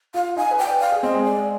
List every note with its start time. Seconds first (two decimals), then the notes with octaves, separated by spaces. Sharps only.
0.14 F4 F5
0.36 D#4 G#5
0.51 B4
0.59 G5
0.66 D5
0.80 F5
0.92 G#4
1.03 C4 D#5
1.14 G#3
1.24 D5